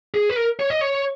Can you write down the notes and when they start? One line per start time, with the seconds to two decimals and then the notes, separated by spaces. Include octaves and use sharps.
0.14 G#4
0.29 B4
0.36 A#4
0.60 C#5
0.70 D#5
0.81 C#5